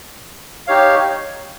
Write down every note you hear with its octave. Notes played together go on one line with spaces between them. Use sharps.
D#4 G4 C#5 F5